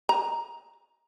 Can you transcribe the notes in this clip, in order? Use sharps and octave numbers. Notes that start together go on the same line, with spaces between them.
A#5